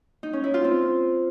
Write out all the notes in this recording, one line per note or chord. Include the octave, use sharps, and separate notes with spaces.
D#4
C#4
E4
F4
C4